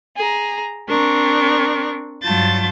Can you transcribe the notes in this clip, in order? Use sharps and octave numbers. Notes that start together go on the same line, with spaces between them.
G#4 A#5
C4 D4 A#4 C#6
G2 F#3 F4 A5 G6 A6